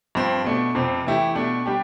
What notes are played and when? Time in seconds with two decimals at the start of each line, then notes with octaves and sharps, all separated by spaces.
0.15 G2 F3 C4
0.44 B2 A3 D4
0.75 F2 C3 F3 C4
1.05 E3 A3 E4 G4
1.35 B2 A3 D4
1.66 G3 D4 G4